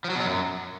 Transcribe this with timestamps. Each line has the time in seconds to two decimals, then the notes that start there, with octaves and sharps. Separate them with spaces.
0.04 F3
0.10 F#3
0.15 B2
0.20 F#3
0.26 F#2